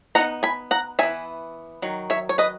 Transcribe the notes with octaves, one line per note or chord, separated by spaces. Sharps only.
E3 B3 D#4 F#5 A#5
G#5 B5
F#5 A#5
E3 B3 D#4 E5 G#5
D#3 F#3
C#5 E5
C#5
B4 D#5